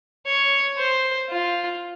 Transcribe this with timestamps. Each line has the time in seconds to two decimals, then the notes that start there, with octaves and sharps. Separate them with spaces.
0.26 C#5
0.78 C5
1.30 F4